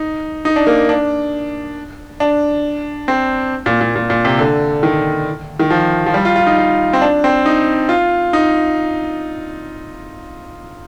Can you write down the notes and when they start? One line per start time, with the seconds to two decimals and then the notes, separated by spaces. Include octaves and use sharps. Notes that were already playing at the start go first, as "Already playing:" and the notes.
Already playing: D#4
0.45 D#4
0.56 D4
0.67 A#3
0.89 D4
2.20 D4
3.08 C4
3.66 A#2
3.81 A#2
3.96 A#2
4.10 A#2
4.25 C3
4.39 D3
4.83 D#3
5.59 D#3
5.70 F3
6.06 F3
6.14 G3
6.25 F4
6.36 F4
6.47 D#4
6.58 F4
6.93 C4
7.02 D4
7.24 C4
7.46 D#4
7.89 F4
8.33 D#4